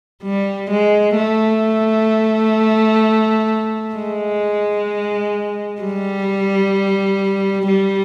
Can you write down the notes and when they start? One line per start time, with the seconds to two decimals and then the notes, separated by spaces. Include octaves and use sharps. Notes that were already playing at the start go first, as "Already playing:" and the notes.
0.23 G3
0.70 G#3
1.17 A3
3.96 G#3
5.81 G3
7.68 G3